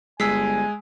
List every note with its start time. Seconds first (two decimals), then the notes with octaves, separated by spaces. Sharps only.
0.20 G1 G#3 G#5 E6 B6 C7